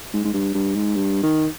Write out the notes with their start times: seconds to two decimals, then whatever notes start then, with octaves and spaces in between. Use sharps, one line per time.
0.14 G#2
0.25 G#2
0.34 G2
0.54 G2
0.75 G#2
0.96 G2
1.23 D#3